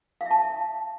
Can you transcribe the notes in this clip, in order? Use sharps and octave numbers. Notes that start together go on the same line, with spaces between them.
F5
E5
A5